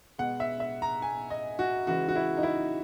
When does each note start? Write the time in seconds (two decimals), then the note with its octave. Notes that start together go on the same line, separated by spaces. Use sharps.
0.18 B2 G#3 F#5
0.40 E5
0.60 E5
0.82 A#5
1.02 G#5
1.30 D#5
1.59 F#4
1.87 C#3 E3 G#3 F#4
2.08 F#4
2.16 E4
2.37 D#4
2.43 E4